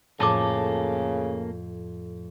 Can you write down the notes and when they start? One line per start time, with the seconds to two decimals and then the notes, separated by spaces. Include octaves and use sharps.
0.20 F2 A2 C#3 A#3 A4 A5 D6